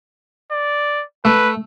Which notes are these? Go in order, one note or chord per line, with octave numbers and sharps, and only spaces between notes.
D5
A3 B4